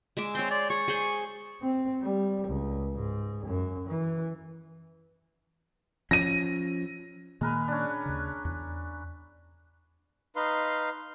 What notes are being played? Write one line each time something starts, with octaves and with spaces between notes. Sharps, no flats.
G#3 E5 D6
C4 C#5 C6
D5
G#4 C#6
G#4 C5
C4
G3
C#2
G#2
F#2
E3
F3 C#4 A#6 D#7
A#2 D#3 G#3 A#3 A#4 B4
C#4 D4
D#2 C#3
E2
D#4 B4 F5 C6